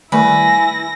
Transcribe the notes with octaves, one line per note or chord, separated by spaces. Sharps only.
D#3 G3 A3 E4 B4 G#5 A#6